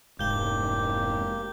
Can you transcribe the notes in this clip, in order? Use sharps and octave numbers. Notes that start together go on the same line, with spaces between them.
F1 G#2 A#3 G4 G6 G7